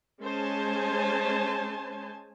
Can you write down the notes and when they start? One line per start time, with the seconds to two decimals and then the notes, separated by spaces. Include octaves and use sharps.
0.21 G#3 C#4 C5 G#5 A5